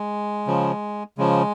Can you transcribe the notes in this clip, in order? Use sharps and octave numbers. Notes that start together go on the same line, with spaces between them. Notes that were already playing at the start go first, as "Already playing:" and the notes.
Already playing: G#3
C#3 F3
C#3 F3 G#3